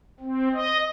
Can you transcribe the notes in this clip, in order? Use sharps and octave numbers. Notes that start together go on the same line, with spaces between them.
C4
D#5